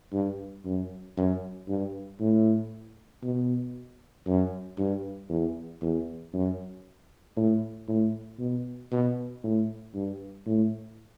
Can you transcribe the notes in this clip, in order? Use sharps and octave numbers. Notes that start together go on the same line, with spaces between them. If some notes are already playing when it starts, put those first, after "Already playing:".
G2
F#2
F#2
G2
A2
B2
F#2
G2
E2
E2
F#2
A2
A2
B2
B2
A2
G2
A2